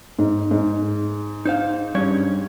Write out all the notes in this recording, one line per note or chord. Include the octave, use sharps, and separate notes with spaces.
G#2
G#2
D#4 C5 F5
G2 C#4 C#5